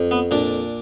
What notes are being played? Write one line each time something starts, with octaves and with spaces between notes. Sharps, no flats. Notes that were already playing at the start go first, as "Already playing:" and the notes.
Already playing: F2
B3
A#2 D4